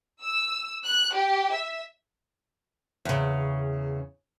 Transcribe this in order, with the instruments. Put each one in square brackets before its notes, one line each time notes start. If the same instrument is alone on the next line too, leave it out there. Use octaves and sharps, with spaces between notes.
[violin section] E6
F#6
G4
E5
[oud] E2 C#3